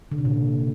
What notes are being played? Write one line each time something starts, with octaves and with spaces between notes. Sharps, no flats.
D3
C3
A#2
C#3